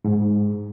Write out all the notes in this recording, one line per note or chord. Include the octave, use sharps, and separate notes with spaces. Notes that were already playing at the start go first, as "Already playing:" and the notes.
G#2